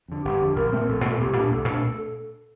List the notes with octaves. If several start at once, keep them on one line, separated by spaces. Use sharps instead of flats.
F2 D3
G1 G4
F2 D3
A#1 A#4
A#2 A3 C4
A#1 A4
A#2 A3 C4
C2 G4
A#2 A3 D4
C2 A4
A#2 A3 D4